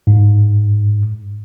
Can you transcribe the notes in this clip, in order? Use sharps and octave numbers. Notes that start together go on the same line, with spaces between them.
G#2